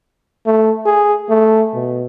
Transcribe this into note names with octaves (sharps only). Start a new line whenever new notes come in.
A3
G#4
A3
B2